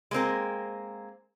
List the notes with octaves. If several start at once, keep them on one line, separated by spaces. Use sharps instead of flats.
G#3 A#3 C4 A#4